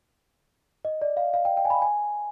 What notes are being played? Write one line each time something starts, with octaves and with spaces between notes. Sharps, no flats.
D#5
D5
F5
F5
G5
G5
G#5
B5
G#5